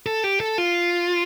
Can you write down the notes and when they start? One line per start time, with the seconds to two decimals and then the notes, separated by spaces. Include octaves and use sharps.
0.06 A4
0.24 G4
0.40 A4
0.58 F4